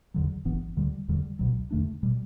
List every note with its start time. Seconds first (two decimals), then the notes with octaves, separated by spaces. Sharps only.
0.14 E2 D3 F#3
0.45 G1 G2 E3 B3
0.76 D2 D3 G3
1.08 E2 D3 G3
1.39 C#2 B2 F#3
1.71 E2 D3 A3 D4
2.03 B2 G3